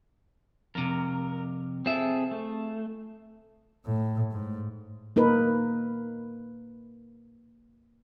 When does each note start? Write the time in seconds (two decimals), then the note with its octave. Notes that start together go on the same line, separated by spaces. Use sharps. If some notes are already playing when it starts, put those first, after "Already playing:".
0.75 F2 C3 A#4
1.86 C4 F4 G#4 A4 E5
2.31 A3
3.86 A2
4.31 G#2
5.16 A#3 D#4 A#4 B4